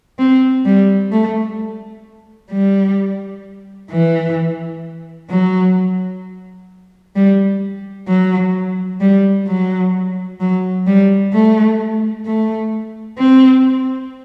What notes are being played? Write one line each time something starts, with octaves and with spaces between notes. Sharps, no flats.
C4
G3
A3
G3
E3
F#3
G3
F#3
G3
F#3
F#3
G3
A3
A3
C4